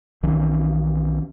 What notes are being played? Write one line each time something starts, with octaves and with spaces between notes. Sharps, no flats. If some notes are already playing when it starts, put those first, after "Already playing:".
B1 D#3 E3 C#4